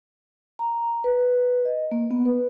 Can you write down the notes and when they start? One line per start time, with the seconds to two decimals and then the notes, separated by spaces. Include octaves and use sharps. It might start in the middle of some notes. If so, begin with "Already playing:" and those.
0.59 A#5
1.04 B4
1.65 D#5
1.91 A#3
2.11 B3
2.25 B4